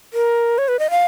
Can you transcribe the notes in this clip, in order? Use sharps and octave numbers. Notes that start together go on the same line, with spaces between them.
A#4
C#5
B4
D#5
F5